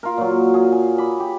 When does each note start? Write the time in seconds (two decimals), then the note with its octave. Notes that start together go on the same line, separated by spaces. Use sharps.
0.03 F4 A#4
0.18 A#2 F#3
0.54 G#4
0.72 G#5
0.98 B5 D6
1.20 G4